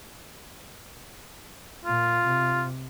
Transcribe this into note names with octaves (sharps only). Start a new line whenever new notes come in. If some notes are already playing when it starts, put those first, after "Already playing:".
A#2 F4
C3